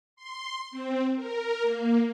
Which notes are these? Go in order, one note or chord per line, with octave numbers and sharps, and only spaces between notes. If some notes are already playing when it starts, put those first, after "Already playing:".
C6
C4
A#4
A#3